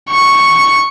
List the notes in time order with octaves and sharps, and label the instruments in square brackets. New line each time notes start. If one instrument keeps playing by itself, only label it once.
[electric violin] C#6